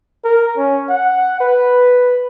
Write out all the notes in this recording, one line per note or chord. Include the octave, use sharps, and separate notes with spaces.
A#4
C#4
F#5
B4